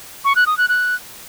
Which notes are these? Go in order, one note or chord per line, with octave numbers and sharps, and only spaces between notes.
C#6
F#6
D#6
F#6
F#6